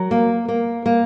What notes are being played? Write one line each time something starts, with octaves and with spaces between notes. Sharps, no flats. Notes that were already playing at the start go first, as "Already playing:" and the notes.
Already playing: F#3 A#4
A#3
A#3
A#3